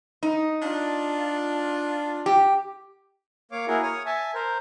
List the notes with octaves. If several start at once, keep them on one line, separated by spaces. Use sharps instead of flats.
D#4
D4 F4
G4
A#3 C#5 F5 D6
A#3 E4 F#4 G#4 A#4
C#5 D#6 F6
E5 G#5 A5
A#4 C5